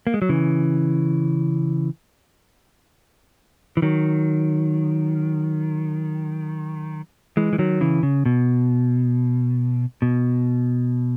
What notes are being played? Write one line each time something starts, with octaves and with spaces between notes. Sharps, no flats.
A#3
G#3
F#3
C#3 E3
E3
D#3 F#3
E3 G#3
E3
D#3 F#3
C#3 E3
C#3
B2
B2